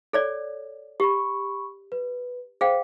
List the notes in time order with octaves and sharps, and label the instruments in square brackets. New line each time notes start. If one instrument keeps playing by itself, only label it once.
[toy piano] A4 C#5 D5
[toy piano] G4 [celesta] B5 C#6
[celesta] B4
[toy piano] G#4 F5 G5 [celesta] C5